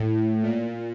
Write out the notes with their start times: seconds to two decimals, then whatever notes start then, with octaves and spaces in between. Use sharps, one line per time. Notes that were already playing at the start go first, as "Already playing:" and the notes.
Already playing: A2
0.42 A#2